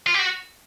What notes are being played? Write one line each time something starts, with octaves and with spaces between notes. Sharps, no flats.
F4
G4
F#4